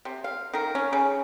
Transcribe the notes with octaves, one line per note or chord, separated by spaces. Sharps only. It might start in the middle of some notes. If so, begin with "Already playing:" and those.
C3
F5
D#3 A#4
C#4
C#3